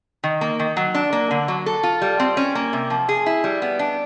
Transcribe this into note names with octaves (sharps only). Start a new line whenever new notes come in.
D#3
A#3
D#3
F#3
D4
A#3
D3
F#3
A4
F4
G3
C4
C#4
A#3
C3
F3
G#4
E4
G3
B3
D4